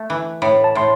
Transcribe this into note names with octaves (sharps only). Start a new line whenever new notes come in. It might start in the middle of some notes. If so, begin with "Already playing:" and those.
Already playing: A3
E3
A2 B5
A5
A2 C6